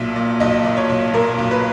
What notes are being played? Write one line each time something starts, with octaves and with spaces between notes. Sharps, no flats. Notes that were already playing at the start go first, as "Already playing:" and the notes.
Already playing: B1 A#2 E5
A#2
B1 D#5
A#2
C#5
B1
A#2 A#4
B1
B4